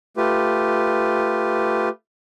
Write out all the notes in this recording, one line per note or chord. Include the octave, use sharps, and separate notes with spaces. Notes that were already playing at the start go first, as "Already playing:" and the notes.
A3 F4 G4 B4